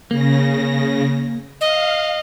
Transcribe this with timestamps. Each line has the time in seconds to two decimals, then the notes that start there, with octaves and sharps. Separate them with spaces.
0.11 C#3 A#3 A#6
1.61 D#5 F5